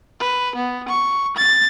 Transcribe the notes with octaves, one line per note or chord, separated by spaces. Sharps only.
B4
B3
C#6
A6